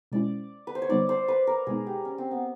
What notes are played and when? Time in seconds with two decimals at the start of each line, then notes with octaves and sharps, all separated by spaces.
0.12 B2 G#3 C#4 E4 D5
0.67 B4
0.75 C5
0.82 C#5
0.89 D3 G3 B3 D#4 D5
1.09 C5
1.28 B4
1.47 A#4
1.67 B2 G#3 B3 D#4 G#4
1.87 G4
2.05 C#4
2.18 C4
2.31 B3